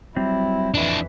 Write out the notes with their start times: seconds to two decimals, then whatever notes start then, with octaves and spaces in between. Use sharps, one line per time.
0.16 F#3 G3 C4 E4
0.74 F2 E3 D4 E4